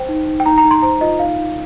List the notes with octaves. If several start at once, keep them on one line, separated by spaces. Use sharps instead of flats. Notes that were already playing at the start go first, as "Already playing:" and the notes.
Already playing: C5 G5
D#4
D#4
G5
D#4 A#5
A#5
D#4
C6
C5 A#5
F4 D#5
D#4 F5
D#4